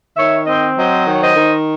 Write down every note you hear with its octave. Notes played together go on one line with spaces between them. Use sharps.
D#3 C#5 E5
C4 C5 D#5
F#3 C5 D#5
D#3
C#5
C5 D#5
D#3